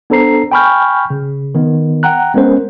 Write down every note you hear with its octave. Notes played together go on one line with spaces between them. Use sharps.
B3 D4 A4 C5 A#5 C7
G5 G#5 B5 C#6 F6 G6
C#3
D#3 B3
F#5 G5 A#5 F#6
G#3 B3 C#4 A#4 C5